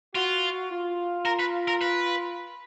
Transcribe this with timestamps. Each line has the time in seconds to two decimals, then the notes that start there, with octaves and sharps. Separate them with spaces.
0.14 F4 F#4
0.70 F4
1.25 A#4
1.39 B4
1.68 A#4
1.81 B4